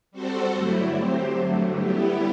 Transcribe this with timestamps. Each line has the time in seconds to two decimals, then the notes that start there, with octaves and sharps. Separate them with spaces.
0.11 G3 C4 F#4 A4 C5
0.52 G2 D3 F#3 A3 E4
0.94 F#3 C4 G4 C5
1.35 G2 D3 F#3 A3
1.75 G3 B3 E4 G4